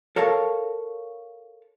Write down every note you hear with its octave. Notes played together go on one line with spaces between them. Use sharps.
A4 A#4 C#5 F5 A5